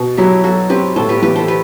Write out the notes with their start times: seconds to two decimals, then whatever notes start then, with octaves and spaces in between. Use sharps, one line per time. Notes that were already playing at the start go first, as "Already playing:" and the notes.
Already playing: B2
0.17 F#3 E4 G4
0.44 F#3 F#4 A4
0.70 C4 G4 B4
0.96 A2 A4 C5
1.09 G4 B4
1.22 E3 G4 B4
1.36 A4 C5
1.48 G4 B4